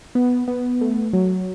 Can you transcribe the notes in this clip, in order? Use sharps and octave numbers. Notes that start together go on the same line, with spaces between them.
B3
B3
A3
F#3